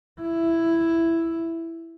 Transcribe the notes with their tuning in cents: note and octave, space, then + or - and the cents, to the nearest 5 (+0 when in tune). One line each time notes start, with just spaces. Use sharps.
E4 +5